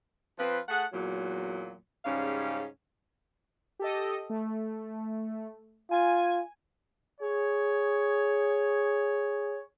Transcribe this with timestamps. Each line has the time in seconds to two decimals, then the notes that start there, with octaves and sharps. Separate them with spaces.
0.39 F3 C4 F4 B4
0.69 A3 G#4 F#5
0.93 E2 A#2 F#3
2.05 G#2 C#3 G3 C#4 F5
3.79 G4 A4 D#5
4.30 A3
5.91 F4 G#5
7.21 G#4 C#5